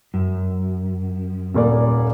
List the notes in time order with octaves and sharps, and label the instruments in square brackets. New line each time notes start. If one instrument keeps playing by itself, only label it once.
[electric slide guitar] F#2
[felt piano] D#1 A#2 D5